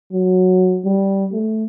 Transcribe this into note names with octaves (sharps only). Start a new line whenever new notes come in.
F#3
G3
A3